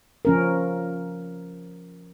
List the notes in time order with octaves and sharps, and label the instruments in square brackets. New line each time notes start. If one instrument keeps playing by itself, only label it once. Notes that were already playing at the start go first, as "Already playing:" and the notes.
[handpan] F3 C#4 A#4